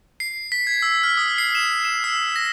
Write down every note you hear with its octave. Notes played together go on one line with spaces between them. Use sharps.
C7
B6
G#6
E6
F6
D#6
C7
E7
E7
E6
A#6